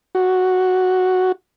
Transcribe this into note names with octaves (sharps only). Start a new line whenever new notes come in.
F#4